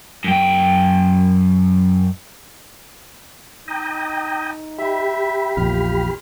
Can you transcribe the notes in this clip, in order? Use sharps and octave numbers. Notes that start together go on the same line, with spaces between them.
F#2 G5
D#4 G5 A#5 D#6
G4 E5 B5
A#1 E2 F4 F6